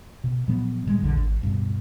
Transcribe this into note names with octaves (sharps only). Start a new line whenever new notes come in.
B2
A#2 F3 F#3 B3
A2 D#3 G3 G#3
D#1 A#1 E2 D3
G#1
D1 G2 B2